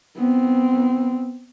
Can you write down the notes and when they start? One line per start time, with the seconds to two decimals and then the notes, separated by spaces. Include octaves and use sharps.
0.18 B3 C4